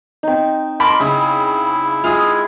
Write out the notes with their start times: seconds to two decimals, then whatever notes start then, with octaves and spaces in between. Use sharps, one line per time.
0.23 C4 D#4
0.80 A#4 A5 B5 C6 D6
1.00 C#3 E4
2.04 G#3 E4 F4 G#4 D#6